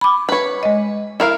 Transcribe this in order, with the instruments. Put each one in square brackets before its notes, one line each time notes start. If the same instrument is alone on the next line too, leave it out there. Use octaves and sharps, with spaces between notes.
[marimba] B5 D6
[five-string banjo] B4 C#5
[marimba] G#3 D#5
[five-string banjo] E4 A#4 F5